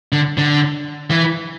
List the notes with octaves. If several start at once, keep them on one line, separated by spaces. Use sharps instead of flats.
D3
D3
E3